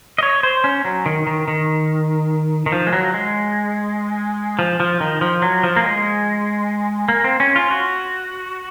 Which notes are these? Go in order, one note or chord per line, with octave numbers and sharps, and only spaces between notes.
D#5
C#5
C5
C#4
F#3
D#3
D#3
D#3
D#3
F3
G#3
F#3
G#3
F3
F3
D#3
F3
F#3
F3
A#3
G#3
A#3
C4
C#4
F4
F#4